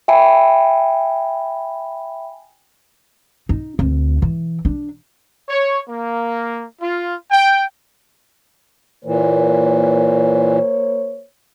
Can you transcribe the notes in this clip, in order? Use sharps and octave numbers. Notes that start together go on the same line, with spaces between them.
E5 G5 G#5 B5
D#4
D2 C4
E3
D4
C#5
A#3
F4
G5
A#2 E3 A#3 C5 C#5